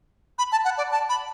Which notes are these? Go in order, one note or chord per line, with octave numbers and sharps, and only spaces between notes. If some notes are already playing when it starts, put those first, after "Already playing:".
B5
A5
F#5
D5
A5
B5